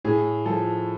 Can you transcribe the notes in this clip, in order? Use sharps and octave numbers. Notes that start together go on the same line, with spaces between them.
A2 G#4
F3 A4